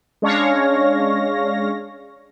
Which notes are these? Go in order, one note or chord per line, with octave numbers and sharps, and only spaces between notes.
G#3 C#4 D4 C#5 F5 A#6